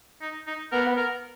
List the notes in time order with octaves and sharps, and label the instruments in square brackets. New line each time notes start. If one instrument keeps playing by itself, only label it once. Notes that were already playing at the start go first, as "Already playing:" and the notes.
[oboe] D#4
D#4
[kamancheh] B3 [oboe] A#4
[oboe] A#4